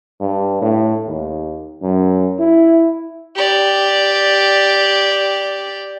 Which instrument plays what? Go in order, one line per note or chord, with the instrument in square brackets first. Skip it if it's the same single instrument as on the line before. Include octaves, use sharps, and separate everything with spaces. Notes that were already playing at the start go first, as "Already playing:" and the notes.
[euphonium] G2
A2
D#2
F#2
E4
[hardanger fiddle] G4 D5